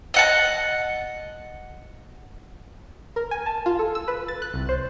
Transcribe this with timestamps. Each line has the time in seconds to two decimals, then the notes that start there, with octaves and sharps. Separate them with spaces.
0.14 D#5 F#5 A5
3.16 A#4
3.31 G#5
3.46 A5
3.66 F4
3.79 A4
3.95 E6
4.08 B4
4.28 A6
4.42 F#6
4.54 C2
4.69 C5